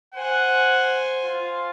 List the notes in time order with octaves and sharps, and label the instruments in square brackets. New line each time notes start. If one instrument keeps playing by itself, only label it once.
[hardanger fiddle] C5 G#5 [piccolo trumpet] F#5
[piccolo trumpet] F4